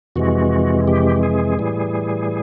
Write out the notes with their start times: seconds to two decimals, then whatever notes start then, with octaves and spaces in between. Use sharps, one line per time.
0.16 F2 C3 E3 G#3 F#4
0.87 G4
1.23 G#4
1.59 A2 E3 G3